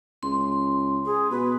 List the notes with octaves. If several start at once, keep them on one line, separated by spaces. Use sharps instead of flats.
C#2 C6
G#4
B2 B4